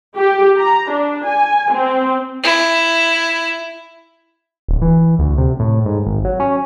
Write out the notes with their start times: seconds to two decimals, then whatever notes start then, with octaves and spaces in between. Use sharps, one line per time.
0.17 G4
0.57 A#5
0.91 D4
1.25 G#5
1.73 C4
2.43 E4
4.68 D1
4.82 E3
5.19 D2
5.38 C3
5.59 A2
5.86 G#2
6.06 G#1
6.25 F#3
6.40 C#4